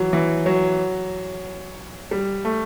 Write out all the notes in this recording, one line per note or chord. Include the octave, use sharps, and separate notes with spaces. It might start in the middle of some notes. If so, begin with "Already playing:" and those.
Already playing: E3 F#3
E3
F#3
G3
A3